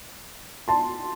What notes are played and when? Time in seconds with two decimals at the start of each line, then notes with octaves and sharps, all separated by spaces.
0.68 A5 C6